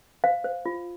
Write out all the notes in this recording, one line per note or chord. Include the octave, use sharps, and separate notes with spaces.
C5 F5
C5
F4